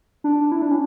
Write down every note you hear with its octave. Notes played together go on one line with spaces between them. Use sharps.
D4
E4
D4
C#4